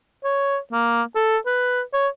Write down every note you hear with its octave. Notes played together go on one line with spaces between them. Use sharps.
C#5
A#3
A4
B4
C#5